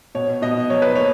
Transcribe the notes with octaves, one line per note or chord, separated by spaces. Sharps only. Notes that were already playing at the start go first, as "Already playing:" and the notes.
B2 C#5
B2 D#5
F#3 C#5
B4
A#3 C#5